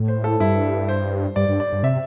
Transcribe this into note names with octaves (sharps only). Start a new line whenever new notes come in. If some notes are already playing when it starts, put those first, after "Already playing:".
Already playing: A2
C5
A4
G2 E4
C5
G2 D5
G2
D5
G2
C3 E5